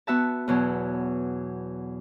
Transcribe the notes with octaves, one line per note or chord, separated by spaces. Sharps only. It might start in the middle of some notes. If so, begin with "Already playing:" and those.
B3 F#4 E5 A5
E2 B2 F#3